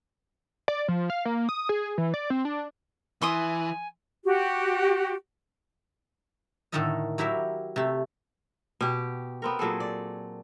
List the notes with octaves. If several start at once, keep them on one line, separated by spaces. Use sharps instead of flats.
D5
F3
F5
A#3
D#6
G#4
E3
D5
C4
D4
E3 E5 G#5 C6 D#6
F#4 G4
A2 D3 D#3 A4 A#4 D#5
F#3 E4 G4 A#4 E5
C3 A3
B2 G4
B3 C4 A#4
A#2 F#3 G#4 A4
D5